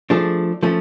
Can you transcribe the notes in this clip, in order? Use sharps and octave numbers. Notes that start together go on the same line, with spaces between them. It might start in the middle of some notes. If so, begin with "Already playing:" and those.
F3 A3 D4 G#4
F3 A3 C#4